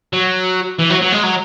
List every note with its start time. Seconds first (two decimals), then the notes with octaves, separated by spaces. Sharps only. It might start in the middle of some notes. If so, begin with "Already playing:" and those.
0.13 F#3
0.79 E3
0.90 F#3
1.02 F#3
1.12 G#3
1.23 F#3